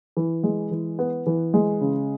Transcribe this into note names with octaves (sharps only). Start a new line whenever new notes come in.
E3
G#3
E3
B3
E3
G#3
C#3